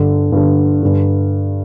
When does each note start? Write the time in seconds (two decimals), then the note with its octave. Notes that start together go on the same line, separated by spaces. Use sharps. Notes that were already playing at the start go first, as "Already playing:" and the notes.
Already playing: G2 D3
0.32 G2 D3
0.83 G2 D3